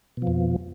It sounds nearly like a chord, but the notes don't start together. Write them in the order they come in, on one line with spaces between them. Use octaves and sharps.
B2 F3 F2